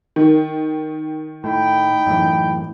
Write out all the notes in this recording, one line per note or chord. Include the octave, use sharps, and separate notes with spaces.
D#3
A2 D#4 G5 B5
F#2 A2 E3